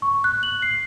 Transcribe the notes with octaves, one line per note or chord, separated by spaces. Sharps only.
C#6
F#6
F#7
C7